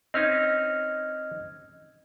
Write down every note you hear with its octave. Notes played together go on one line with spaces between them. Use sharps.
C4 C#4 D#4 D#5 F6 G#6